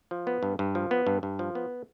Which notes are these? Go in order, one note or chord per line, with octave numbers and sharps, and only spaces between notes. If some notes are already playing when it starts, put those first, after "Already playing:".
F3
B3
G2
G2
F3
B3
G2
G2
F3
B3